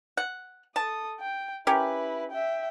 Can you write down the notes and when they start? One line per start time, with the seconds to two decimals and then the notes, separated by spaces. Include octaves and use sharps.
0.17 F#5
0.76 A4 A5 D#6
1.20 G5
1.67 C#4 E4 G4 A#4 B4
2.31 E5 G5